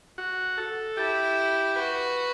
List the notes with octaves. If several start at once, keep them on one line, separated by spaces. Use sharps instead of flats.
F#4
A4
E4 G4
F#4 B4